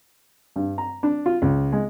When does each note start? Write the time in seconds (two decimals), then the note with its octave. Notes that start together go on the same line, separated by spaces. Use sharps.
0.56 G2
0.78 A#5
1.03 D4
1.26 F4
1.42 C#2
1.73 G#3